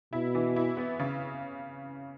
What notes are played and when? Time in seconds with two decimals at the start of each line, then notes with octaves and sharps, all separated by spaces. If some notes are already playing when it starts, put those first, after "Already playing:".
0.13 B2 E4
0.35 E3
0.56 E4
0.77 B3
0.99 C#3